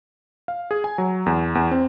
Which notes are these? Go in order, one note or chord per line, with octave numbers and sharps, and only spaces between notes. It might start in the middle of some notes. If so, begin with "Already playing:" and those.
F5
G#4
G#5
F#3
E2
E2
C4